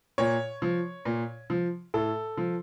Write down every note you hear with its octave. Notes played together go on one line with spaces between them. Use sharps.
A#2 C#5
F3
A#2
F3
A2 A4
F3